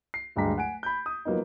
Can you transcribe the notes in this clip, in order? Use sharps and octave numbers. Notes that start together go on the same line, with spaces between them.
C7
D1 G2 G#3 G4 A#5 B6
F#5 G#5 D7
B5 G6
D#6
F3 F#3 A#3 B3 D#4